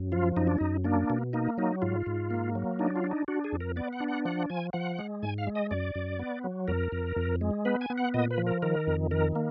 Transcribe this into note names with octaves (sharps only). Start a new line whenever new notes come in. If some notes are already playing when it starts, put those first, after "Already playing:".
Already playing: F#2
F3 F4
F#2 D#4
D4
F#2 D#4
A#3 D4
B2
A#3 D#4
F#3 D#4
G#2 F4
G#2
A#3
F#3
D4 D#4
F4
D4
D#4
D4 F#4
G#4
F2
A#4
B3 D5
F#5
D4
F#5
F3 F#5
F3 G#5
F3 F#5
G#3
G#2 G#5
F5
G#3
D#5
F#2 D5
F#2
B3
F#3
F2 A#4
F2
F2
G#3
B3 B4
G#5
B3
F#5
A#2 D#5
B4
F3
A#4
D#3 A#4
F2
D#3 A#4
A#3